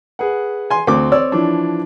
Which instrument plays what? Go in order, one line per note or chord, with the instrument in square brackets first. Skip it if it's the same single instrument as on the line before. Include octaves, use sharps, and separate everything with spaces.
[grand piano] G#4 B4 F#5
[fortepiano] G#5 C6
[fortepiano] D2 D6 [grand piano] C4
[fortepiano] C#5 D5 E6
[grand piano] E3 F3 D4